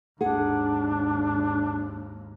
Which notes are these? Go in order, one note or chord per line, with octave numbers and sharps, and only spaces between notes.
G#1 D#2 D4 G#4 F#5